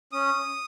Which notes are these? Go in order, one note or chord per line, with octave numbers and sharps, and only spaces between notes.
C#4 D#6